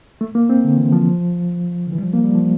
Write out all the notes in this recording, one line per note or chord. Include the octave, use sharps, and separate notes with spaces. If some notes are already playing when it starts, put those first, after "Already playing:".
A3
A#3
C4
D3
E3
F3
D3
E3
G3
F3
A#3
G3
F3